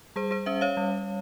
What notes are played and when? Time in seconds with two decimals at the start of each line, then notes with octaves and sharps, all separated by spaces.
0.16 G3 G#4 C5
0.31 G#4 C5
0.46 C#4 C5 E5
0.61 C#5 F5
0.77 G3